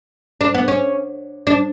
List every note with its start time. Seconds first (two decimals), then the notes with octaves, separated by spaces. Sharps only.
0.41 D4
0.54 B3
0.68 C#4
1.47 D4